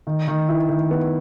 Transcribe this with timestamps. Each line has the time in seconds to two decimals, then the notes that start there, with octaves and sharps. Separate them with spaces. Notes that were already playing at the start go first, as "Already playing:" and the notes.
0.07 D#3
0.28 D#3
0.49 E4
0.69 D#3
0.91 B3